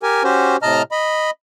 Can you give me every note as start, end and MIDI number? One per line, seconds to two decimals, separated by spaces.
0.03 0.23 67
0.03 0.23 70
0.03 0.23 80
0.24 0.57 61
0.24 0.57 66
0.24 0.57 67
0.24 0.57 72
0.62 0.82 45
0.62 0.82 48
0.62 0.82 75
0.62 0.82 81
0.62 0.82 82
0.62 0.82 89
0.91 1.30 75
0.91 1.30 83